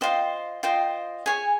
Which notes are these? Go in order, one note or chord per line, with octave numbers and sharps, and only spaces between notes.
F4 C5 D#5 G5
F4 C5 D#5 G5
G#4 C#5 G#5